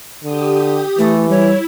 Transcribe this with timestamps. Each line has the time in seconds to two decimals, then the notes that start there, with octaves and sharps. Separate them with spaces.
0.24 D3 G4 D#6
0.99 E3 A3
1.30 G3 E4 C#5